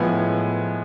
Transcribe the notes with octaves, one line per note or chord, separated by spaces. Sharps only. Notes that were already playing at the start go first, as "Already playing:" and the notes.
Already playing: A2 F3 G#3 B3 G#5 G#6